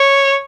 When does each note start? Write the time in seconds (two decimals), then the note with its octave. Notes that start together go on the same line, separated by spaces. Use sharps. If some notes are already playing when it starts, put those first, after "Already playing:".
Already playing: C#5